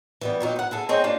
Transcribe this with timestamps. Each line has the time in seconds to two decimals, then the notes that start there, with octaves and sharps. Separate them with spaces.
0.21 E3 G3 B3
0.40 A#2 F#3 D#4 G4
0.56 B4 F#5
0.71 E4 G#4 A4
0.89 C4 D#4 G#4 C#5 G5
1.04 A#3 D4 D#4 F4 G4